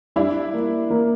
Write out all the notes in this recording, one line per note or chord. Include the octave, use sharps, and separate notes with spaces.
G3 D4 E4
A#3
A#3